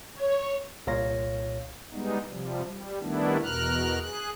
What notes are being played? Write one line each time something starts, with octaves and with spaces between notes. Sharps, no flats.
C#5
C2 A#2 C#5 F5 A#6
G3 G#3 B3 D#4
C3 F3 G3
G3
D#3 G3 A3 B3 D4 E4
E2 B2 A#4 F6 F#6
G#4 F#6